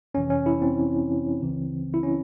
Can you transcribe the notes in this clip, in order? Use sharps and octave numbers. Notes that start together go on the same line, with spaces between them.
G1 F2 C3 E3 C#4
C#4
E4
C4
C#2 C#3 E3
E4
C#4